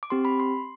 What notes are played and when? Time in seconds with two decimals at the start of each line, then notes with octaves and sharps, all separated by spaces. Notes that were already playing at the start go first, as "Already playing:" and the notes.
0.03 D6
0.10 C4 G4 C6
0.25 B5
0.40 C6